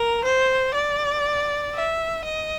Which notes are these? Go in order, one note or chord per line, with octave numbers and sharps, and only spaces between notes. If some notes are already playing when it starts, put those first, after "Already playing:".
Already playing: A#4
C5
D5
E5
D#5